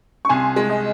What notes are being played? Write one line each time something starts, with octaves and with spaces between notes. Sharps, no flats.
C#6
C2 G#5 C6
G#3
D#5